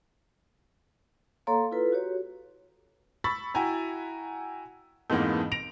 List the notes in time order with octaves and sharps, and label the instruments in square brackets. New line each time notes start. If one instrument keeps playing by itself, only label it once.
[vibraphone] A#3 A4 C#5 F5 A#5 C6
E4 F4 A4 B4
F#4 G4 C#5
[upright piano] B5 C#6 E6 A6 B6
E4 F#4 G5 G#5 A#5
F2 G#2 E3 A#3 B3
A#6 D7 F7